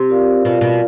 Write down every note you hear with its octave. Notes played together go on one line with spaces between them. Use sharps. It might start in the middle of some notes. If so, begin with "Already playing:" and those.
Already playing: C3
F4 A#4 D5 F5
B2 F4 A#4 D5 F5
B2